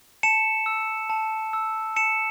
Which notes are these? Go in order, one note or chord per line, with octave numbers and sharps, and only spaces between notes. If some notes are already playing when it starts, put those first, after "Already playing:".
A5 C#7 E7
E6
A5
E6
A5 C#7 E7